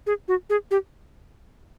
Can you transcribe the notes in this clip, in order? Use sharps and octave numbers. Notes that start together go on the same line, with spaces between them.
G#4
F#4
G#4
G4